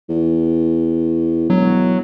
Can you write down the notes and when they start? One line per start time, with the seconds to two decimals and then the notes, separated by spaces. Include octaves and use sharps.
0.09 E2
1.50 E1 F#3